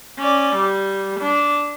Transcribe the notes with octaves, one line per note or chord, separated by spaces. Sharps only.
C#4 D5
G3
D4